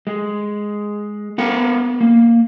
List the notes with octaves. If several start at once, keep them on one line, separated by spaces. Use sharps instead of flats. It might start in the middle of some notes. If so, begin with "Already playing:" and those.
G#3
B3 A#4 F5 F#5
A#3